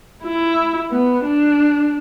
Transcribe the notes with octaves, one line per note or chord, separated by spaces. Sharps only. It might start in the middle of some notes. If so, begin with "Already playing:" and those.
E4
B3
D4